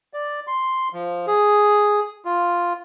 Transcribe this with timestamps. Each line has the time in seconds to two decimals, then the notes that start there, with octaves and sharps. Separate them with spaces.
0.14 D5
0.47 C6
0.94 F3
1.27 G#4
2.25 F4